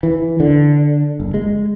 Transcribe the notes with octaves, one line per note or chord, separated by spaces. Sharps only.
E3
D3
F#1
G#3